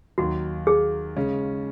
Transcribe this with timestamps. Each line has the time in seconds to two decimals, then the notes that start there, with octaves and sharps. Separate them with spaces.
0.18 D#2 D#3 F#3 F#4
0.67 G#4
1.16 C#3 G#3 C#4